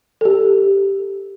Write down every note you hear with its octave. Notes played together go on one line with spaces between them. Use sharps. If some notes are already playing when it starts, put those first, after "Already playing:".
G4 A4